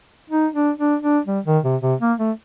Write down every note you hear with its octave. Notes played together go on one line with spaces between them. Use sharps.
D#4
D4
D4
D4
G3
D#3
C3
C3
A#3
A3